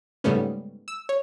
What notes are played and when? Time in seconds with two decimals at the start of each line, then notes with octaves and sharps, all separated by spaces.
0.24 G#2 C#3 G3 A3 B3 C#4
0.88 E6
1.09 C#5